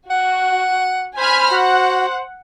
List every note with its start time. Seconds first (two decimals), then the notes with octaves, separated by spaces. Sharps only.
0.10 F#4 F#5
1.18 C5 G#5 B5 F6
1.51 F#4 F#5